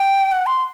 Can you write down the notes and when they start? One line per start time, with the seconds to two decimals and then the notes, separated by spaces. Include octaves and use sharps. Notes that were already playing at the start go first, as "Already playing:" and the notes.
Already playing: G5
0.32 F#5
0.46 C6